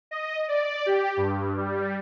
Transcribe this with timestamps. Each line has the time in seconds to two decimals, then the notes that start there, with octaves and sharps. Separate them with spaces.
0.11 D#5
0.48 D5
0.86 G4
1.17 G2
1.57 G3